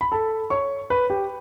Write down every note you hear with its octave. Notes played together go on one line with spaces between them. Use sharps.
B5
A4 A5
C#5 C#6
B4 B5
G4 G5